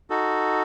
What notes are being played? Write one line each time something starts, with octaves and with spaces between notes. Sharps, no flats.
D#4 F#4 A4